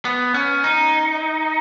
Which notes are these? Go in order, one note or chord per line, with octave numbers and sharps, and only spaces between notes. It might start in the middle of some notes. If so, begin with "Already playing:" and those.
B3
C#4
D#4